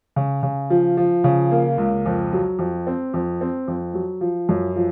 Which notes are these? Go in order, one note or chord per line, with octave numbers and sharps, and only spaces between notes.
C#3
C#3
F3
F3
C#3
A#3
C#2
F2
F#3
F2
C4
F2
C4
F2
F#3
F3
F#2
F3